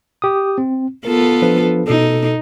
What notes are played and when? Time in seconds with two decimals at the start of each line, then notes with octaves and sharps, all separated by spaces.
0.22 G4 D#6
0.58 C4
1.05 B3 F4 A4 A#4
1.42 F3 D4 B4
1.88 B2 D#4 A4